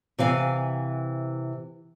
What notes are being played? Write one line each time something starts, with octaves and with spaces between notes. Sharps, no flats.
C3 E3 F5 G#5